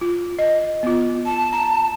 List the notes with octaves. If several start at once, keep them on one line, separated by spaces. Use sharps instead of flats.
F4
D#5
B3 F4
A5
A#5